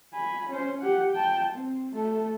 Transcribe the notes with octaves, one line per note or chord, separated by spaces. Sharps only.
G#5 B5
C#4 C5
G4 F#5
G5 A5
C4
A3 A4